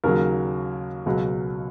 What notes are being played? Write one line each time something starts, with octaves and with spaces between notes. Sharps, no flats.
D#2 C#3 F#3 A#4
C#2 B2 F#3